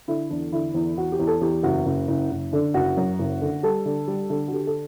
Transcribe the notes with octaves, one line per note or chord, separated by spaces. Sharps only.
D3 E4
E2 D4
D3 E4
E2
E2 F#4
G4
E2
A4
E2 G4
F#1 F#4
F#1
F#1
F#1
D3 D4
F#1 F#4
F#2
F#1
D3
G3 A4
D3
G3
D3
F#4
D3 G4
A4